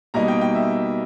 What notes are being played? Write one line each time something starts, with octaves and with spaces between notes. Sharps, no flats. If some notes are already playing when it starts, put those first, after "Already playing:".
B2 G3 A#3 D#4 A#5
G5
G5
E5